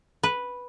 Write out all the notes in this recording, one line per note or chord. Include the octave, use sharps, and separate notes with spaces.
B4